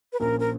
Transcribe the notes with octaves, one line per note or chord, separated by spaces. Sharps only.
B4
A#1 A#2 F3 A#3 C#4 A#4
A#4